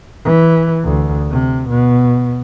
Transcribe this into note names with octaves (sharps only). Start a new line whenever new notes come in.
E3
D2
C3
B2